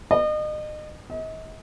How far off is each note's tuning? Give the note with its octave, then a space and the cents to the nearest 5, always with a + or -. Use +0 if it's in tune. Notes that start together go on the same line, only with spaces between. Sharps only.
D#5 -35
D#5 +40